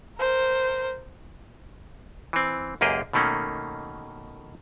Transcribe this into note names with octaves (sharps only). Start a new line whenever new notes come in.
A#4 C5
E3 C4
C#2 F#2 A#3 G4 G#4 D#5
B2 D#3 A3 A#3 C#4